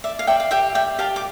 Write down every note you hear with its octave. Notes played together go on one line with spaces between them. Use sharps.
D5 E5
F5
D5 E5 G5
F5
G4 E5 G5
D5 E5 G5
G4 F5 A5
D6